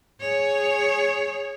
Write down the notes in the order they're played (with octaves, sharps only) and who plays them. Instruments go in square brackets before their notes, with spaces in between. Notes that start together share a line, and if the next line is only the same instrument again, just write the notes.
[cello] G#4 C#5